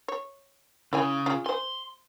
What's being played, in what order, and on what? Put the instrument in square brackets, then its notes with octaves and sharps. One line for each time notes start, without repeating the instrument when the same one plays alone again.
[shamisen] C#5
[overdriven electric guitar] C#3 [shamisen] E4 C#5 G#5
[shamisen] C#4 F4 G#4
[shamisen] C5 G#5 [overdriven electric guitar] C6